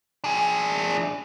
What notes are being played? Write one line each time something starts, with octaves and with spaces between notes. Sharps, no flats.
D4 G#4